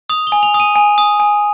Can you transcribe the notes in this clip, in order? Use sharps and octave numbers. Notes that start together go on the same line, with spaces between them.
D#6 F7
G7
G#5
F7
D#6
D#7
G#5
D#6
G#5